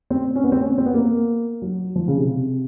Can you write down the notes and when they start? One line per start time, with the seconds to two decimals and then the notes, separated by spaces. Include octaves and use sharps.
0.10 C4
0.36 C#4
0.44 B3
0.52 C4
0.61 C#4
0.78 C4
0.86 B3
0.94 A#3
1.62 F#3
1.95 F3
2.08 C#3
2.18 C3